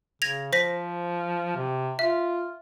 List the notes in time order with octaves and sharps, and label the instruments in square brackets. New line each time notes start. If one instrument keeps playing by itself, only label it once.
[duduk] C#3 [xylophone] G#6 A#6 F7
[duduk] F3 [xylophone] C5 A#6 B6
[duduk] C3
[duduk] F4 [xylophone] E5